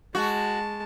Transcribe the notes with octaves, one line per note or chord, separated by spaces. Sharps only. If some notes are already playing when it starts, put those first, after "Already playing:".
G#3 F#4 A5